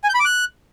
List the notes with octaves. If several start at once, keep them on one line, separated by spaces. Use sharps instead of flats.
G#5
G6
B5
D6
F#6